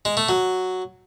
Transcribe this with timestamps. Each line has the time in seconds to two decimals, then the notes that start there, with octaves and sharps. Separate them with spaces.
0.05 G#3
0.17 A3
0.29 F#3